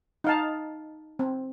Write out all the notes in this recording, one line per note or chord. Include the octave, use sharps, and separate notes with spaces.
D#4 F5 A5
C4